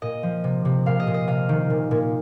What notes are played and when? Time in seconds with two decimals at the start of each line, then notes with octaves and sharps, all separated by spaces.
0.02 A#2 D#5
0.23 F3
0.44 C3
0.65 C3
0.86 A#2 F5
1.00 D#5
1.07 A#2
1.14 D#5
1.27 C3 F5
1.49 D#3
1.70 A#2
1.91 A#2